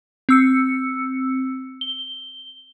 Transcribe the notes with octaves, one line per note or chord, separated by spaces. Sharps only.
C4 E6 C#7
G7